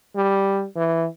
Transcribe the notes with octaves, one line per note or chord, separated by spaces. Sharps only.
G3
E3